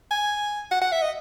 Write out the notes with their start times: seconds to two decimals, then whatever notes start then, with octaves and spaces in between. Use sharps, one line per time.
0.11 G#5
0.71 F#5
0.82 F#5
0.92 E5
1.02 D#5